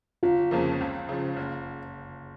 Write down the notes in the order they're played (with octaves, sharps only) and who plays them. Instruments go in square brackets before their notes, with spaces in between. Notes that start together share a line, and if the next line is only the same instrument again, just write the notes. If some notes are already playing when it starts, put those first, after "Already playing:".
[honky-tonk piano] G1 [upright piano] F4
[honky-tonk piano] F2 C#3 F3 A#3
C#2
C#3 F3
F#1